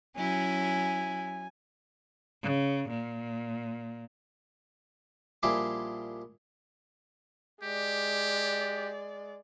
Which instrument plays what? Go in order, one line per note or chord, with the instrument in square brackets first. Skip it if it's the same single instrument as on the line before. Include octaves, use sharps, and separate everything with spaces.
[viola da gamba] F#3 C#4 E4 [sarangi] G#5
[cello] C#3
A#2
[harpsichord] A#1 F3 G3 E4 G#4 D6
[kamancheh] G#3 D5 [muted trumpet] G4